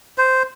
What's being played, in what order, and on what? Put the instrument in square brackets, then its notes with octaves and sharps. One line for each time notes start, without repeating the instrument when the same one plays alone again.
[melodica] C5